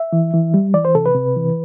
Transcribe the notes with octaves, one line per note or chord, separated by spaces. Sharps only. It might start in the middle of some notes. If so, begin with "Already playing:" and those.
Already playing: E5
E3
E3
G3
E3 D5
C5
C3 A4
B4
C3
E3